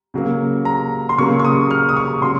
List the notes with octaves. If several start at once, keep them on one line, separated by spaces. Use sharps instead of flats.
C#3 F#3 A#3
A#5
C6
C#3 F#3 A#3 C#6
C#6
D#6
F6
D#6
C#6
C#3 F#3 C6